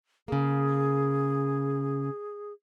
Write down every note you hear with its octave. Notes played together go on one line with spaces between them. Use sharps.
C#3 A#3 G#4